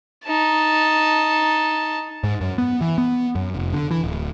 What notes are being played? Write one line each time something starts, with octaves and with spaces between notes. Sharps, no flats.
D#4 A5
G#2
F#2
B3
E3
B3
F#2
F1
D3
E3
D1